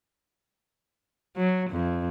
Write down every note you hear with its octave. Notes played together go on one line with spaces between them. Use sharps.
F#3
F2